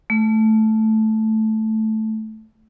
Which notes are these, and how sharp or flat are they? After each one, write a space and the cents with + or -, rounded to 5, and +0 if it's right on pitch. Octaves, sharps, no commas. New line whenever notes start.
A3 -5